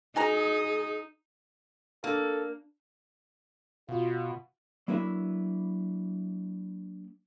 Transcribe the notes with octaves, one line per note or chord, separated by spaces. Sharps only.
D#4 F#4 G#4 G#5 A#5
A#3 D4 A4
B2 F4 F#4
F#3 A#3 D4 E4 B4 E5